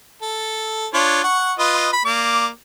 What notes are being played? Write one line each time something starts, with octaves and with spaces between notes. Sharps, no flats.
A4
D4 F4 C#5
F#5 C#6
F4 B4 D#5
B5
A#3 D5 D6